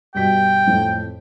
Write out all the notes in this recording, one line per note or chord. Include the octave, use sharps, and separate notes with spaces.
G2 B2 G5 B6
F2 A2